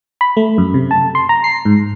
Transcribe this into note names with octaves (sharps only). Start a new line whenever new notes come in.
B5
A3
F#2
C3
A5
C6
A#5
C7
G#2